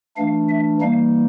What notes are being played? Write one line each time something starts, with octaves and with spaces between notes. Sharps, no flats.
E3 A3 D4 F5
E5
E3 G3 A#3 D#4 F5